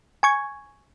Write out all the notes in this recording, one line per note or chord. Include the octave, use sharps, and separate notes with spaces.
G#5 C#6 G#6